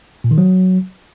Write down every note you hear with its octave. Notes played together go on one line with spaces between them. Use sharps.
A#2
D#3
F#3